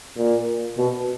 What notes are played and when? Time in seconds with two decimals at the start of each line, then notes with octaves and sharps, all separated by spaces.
0.18 A#2
0.78 B2